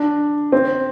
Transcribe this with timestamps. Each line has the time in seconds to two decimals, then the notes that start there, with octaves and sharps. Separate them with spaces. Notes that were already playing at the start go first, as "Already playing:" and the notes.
Already playing: D4
0.52 C4